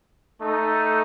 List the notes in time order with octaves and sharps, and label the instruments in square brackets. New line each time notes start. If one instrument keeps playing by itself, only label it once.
[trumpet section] A3 D#4 A4